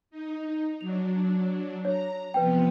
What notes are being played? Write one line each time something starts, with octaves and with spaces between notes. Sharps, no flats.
D#4
F#3 D4 F7
C#5 A#5
C3 F3 B3 B4 G5